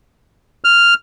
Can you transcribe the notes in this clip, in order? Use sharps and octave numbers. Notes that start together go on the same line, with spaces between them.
F6